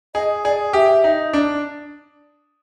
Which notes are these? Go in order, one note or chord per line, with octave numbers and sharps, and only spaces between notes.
G#4 D#5
G#4 D5
G4 E5
D#4
D4